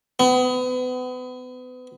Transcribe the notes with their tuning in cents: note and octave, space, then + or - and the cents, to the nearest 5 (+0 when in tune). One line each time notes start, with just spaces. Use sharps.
B3 +35